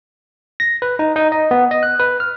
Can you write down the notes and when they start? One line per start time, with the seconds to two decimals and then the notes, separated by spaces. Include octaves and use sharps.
0.60 A#6
0.82 B4
0.99 D#4
1.16 D#4
1.32 D#5
1.51 B3
1.71 D#5
1.83 F#6
2.00 B4
2.20 F6